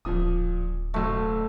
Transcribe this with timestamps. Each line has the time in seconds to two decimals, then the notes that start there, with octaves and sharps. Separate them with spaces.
0.05 D1 A#2 F3 D#6
0.94 F#1 B1 A3